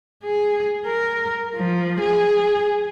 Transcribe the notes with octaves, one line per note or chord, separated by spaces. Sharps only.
G#4
A#4
F3
G#4